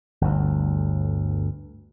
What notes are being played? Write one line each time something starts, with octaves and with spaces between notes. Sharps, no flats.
G1 D2